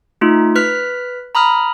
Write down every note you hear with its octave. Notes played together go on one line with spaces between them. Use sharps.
A3 D#4 F4
B4 F6 F#6 B6
A#5 B5 D#6 F6